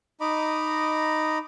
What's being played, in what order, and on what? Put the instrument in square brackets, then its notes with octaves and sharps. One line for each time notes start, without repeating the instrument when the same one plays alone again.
[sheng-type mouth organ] D#4 D#5 A#5 B5 D6